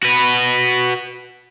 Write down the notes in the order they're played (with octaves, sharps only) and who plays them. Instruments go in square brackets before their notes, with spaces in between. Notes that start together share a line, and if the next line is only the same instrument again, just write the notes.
[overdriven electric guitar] F#4 B4